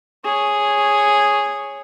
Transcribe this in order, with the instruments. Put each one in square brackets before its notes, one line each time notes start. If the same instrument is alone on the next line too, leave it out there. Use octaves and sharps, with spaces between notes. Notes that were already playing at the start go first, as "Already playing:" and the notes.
[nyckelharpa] G#4 C#5